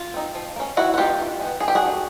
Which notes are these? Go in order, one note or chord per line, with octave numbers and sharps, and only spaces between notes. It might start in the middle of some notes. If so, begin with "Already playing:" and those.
Already playing: F4
C4 D#4
F3
A#3 C#4
D#3 E4 F#4
F#4
G#3 B3 D#4 F4 G4
D#3
G#3 B3
F3 G#4
G4
F#4 G#4
A3 D4